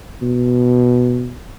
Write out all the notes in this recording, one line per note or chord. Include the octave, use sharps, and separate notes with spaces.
B2